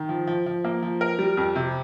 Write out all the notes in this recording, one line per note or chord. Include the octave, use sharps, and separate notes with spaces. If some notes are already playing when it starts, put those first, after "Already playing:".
Already playing: D#3
F3
F3
F3
A#3
F3
A#4
G3
F2
C3